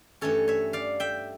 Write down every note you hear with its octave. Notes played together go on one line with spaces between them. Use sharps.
G2 E3 A3 C#4 A4 C#5
C#5 E5
D5 F5
E5 G5